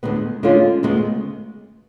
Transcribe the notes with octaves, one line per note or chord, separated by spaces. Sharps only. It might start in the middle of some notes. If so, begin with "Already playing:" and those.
D2 D3 G#3 B3
D3 G#3 C#4 F4
D2 C#3 G#3 B3